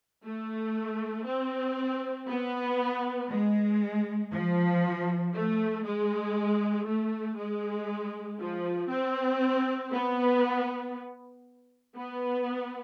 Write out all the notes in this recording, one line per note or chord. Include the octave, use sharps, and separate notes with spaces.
A3
C4
B3
G#3
F3
A3
G#3
A3
G#3
F3
C4
B3
B3